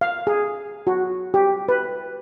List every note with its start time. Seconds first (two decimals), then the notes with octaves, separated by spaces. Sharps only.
0.01 F5
0.27 G#4
0.87 F#4
1.34 G4
1.69 B4